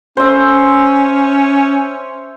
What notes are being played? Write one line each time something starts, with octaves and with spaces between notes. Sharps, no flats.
C#4 C5 E5